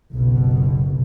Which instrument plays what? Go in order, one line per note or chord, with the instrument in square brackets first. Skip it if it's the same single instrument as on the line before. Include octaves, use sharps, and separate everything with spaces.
[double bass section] F#1 B1 B2